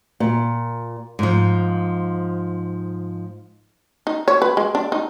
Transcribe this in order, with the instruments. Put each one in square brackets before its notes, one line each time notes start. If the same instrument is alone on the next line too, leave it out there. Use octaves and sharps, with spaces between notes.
[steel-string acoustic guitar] A#2
[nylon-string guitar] G#2 F3
[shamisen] D#4
C#5
B4
G#3
D4
D#4